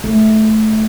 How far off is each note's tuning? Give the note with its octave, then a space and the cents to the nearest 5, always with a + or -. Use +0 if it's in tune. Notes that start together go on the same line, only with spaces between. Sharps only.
A3 -15